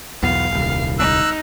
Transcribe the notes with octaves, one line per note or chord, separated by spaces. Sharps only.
B1 E2 B3 F5
D#1 C2
D#4 E6 F#6